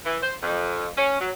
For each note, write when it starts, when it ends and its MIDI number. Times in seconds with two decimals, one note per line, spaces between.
0.05 0.18 52
0.23 0.35 72
0.43 0.88 41
0.97 1.18 61
1.21 1.31 54